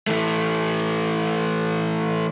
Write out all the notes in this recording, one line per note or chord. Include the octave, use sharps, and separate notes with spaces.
E3 A3